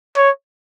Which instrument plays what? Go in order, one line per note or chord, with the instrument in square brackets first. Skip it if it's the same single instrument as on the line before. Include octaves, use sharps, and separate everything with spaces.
[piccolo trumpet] C#5